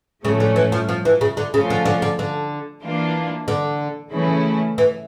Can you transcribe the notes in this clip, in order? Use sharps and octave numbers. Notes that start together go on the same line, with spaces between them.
A2 C#3 F3 A3 C#4
D3
E3
F3
F3
E3
C#3
D3
C#3 F3 A3 C#4 F4
D3
D3
D3
D3
E3 A#3 D4 F4
D3
C#3 E3 A3 C#4 E4
E3